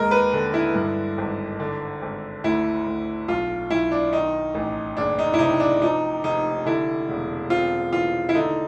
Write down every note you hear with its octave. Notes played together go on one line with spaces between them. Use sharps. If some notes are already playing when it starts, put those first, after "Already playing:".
Already playing: D#2 G#3 A#4
B4
D3
E4
G2
G#1
D3
G#1
D2 E4
D2
B1 F4
B1 E4
D4
D#3 D#4
A1
F#1 D4
D#4
E4
C3 D#4
D4
F3 D#4
F1 D#4
D3 E4
E1
C4 F4
E3 F4
E4
D3 D#4